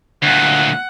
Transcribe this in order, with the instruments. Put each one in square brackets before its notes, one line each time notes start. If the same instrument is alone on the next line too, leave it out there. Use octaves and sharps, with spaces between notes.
[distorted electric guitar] D2 A#2 [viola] F#5